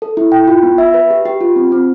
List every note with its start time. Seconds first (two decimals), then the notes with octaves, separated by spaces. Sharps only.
0.02 A4
0.17 E4
0.32 G5
0.48 F4
0.63 B3
0.78 E5
0.94 B4
1.10 G4
1.26 G4
1.41 F4
1.56 C4
1.72 C4